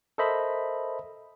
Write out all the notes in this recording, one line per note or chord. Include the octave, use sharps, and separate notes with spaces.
A4 A#4 C5 D#5 E5 B5